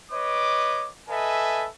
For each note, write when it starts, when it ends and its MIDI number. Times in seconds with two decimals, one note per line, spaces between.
0.12 0.89 71
0.12 0.89 73
0.12 0.89 75
0.12 0.89 86
1.09 1.67 69
1.09 1.67 71
1.09 1.67 75
1.09 1.67 76
1.09 1.67 80